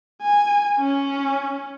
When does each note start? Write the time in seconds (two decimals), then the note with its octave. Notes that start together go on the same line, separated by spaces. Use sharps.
0.22 G#5
0.79 C#4